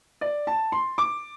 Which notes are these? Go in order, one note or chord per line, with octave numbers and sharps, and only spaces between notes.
D5
A5
C6
D6